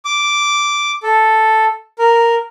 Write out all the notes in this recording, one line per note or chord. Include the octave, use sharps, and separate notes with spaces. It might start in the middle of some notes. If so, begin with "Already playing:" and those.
D6
A4
A#4